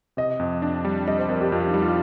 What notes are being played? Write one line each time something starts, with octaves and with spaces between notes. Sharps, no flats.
C3 D#5
F2
D4
G3
G3 D#5
C5
F2 A#4
G4
F2 F4
D#4
G3
F4